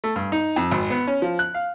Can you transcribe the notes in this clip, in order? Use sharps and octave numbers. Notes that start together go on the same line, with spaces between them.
A3
G2
D#4
F2
G#1
B3
C#4
F3
F#6
F5